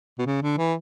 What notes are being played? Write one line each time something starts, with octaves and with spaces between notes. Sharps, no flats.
B2
C#3
D3
E3